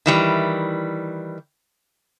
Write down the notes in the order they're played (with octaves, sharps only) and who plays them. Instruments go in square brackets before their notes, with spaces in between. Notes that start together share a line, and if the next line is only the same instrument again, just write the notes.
[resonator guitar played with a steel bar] D#3 E3 G3